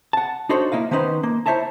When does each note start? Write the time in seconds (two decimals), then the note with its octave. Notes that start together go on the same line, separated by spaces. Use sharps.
0.13 F#5 A5
0.49 D4 D#4 F#4 A4 C5 C#5
0.72 A#3 E4 D#5 F5
0.91 D#3 B3 C#4 D#4 B4 C5
1.23 A#3
1.46 E4 C5 C#5 E5 A5 A#5